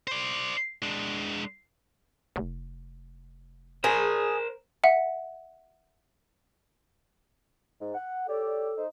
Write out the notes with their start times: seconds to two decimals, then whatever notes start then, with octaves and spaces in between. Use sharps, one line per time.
0.07 C5 D5
0.82 G#3 D4
2.36 F1
3.84 G#4 A#4 C5
4.84 E5 F#5
7.79 G#2
7.94 F#5
8.27 G4 A4 C#5 D5
8.76 D#4 C5